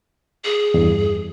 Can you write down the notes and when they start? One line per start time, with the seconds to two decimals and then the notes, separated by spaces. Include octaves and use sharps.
0.45 G#4
0.74 E2 G2